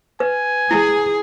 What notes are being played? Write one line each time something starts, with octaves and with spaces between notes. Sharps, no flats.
B4 G#5
E4 G#4